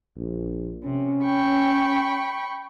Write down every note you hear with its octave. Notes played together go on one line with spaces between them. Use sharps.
A#1
C3 C#4
G5 B5 C#6